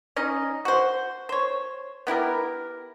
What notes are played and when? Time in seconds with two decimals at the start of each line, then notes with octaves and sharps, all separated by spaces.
0.16 C#4 D#4 D#5
0.65 F#4 C5
1.29 C5 C#5
2.07 B3 E4 G4 A#4